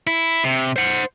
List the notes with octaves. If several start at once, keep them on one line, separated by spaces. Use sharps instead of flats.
E4
C3
C5 F#5